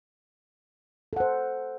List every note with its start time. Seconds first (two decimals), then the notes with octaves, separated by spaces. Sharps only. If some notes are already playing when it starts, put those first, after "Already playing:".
1.13 A4
1.16 F#5
1.20 C5